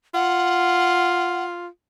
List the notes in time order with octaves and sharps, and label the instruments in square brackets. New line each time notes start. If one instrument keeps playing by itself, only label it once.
[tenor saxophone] F4 [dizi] F#5